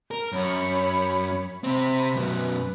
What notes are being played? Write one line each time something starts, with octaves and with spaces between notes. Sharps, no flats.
A#4
F#2 C#5 B5
C3 C4 E5 B5
F#2 B2 B4